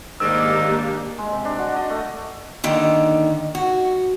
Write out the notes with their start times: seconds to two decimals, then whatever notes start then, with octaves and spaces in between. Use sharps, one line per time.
0.20 G#2 D#3 A#3 D4 G4 E6
1.18 G#3
1.32 C3
1.45 D4
1.59 F#4
1.76 D#5
1.90 A3
2.64 D3 D#3 A#3
3.55 F#4